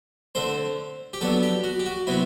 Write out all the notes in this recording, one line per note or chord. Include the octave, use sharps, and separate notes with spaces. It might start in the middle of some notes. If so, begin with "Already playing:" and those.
D3 A3 C4 C5
G4
F#3 B3 D4 A4
G4
F#4
G4
F#4
C3 F#3 B3 E4